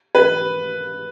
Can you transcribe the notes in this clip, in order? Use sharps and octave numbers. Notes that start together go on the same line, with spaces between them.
B4